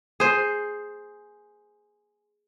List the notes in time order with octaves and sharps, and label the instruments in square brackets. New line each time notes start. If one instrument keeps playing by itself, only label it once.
[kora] G#4 C5